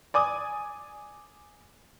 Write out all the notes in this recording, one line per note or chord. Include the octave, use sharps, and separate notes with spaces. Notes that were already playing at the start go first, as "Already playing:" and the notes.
D5 G#5 D6 D#6